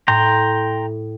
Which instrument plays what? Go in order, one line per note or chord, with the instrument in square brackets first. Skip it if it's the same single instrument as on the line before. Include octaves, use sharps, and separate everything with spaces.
[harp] A2 [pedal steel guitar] G5 A#5 C6